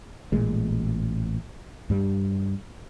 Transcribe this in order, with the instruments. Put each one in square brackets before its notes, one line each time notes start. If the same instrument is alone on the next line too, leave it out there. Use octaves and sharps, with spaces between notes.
[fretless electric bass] A1 A#2 G#3
G2 G3